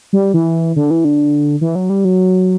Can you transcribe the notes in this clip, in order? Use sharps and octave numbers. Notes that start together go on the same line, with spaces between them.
G3
E3
D3
E3
D3
E3
F#3
G3
F#3